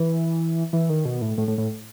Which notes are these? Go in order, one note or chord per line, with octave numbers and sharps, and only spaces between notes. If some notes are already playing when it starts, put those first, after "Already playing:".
Already playing: E3
E3
D#3
B2
A2
A2
A2
A2